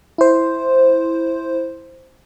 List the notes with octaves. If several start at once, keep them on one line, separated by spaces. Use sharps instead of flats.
E4 C5